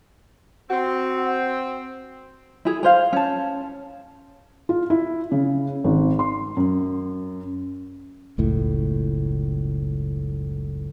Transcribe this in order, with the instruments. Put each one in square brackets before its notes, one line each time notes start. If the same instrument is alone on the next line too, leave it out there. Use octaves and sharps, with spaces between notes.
[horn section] C4 [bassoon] F#4
[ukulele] E4 G#4
G#4 C5 F5
C#4 A5
[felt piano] F4
E4
C#3
G#1
C6
F#2
[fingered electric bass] F#1 C#2 A2